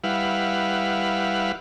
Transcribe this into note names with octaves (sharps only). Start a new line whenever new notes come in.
G3 E4 B4 F5 F#5